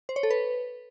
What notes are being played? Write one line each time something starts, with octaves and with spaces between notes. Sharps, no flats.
C5
C#5
A4
B4